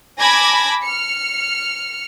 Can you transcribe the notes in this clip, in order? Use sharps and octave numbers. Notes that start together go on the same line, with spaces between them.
G#5 A5 B5 D6 G#6 A#6
F6 C#7